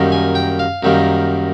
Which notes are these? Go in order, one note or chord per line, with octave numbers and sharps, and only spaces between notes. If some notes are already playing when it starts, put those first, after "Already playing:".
Already playing: F#2 D#3 G3 A#3
G#5
G5
F5
F#2 D#3 G3 A#3